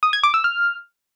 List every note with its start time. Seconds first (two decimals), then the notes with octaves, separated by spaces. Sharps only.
0.03 D#6
0.13 G#6
0.23 D6
0.34 E6
0.44 F6